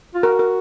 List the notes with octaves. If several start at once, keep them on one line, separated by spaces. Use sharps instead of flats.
F4
F#4 A#4
A#4